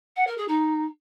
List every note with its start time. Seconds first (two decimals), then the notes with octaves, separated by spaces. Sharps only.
0.16 F#5
0.27 A#4
0.37 G#4
0.48 D#4